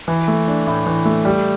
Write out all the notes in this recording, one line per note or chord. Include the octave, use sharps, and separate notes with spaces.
E3
A3
D4
A2
E3
A3
G3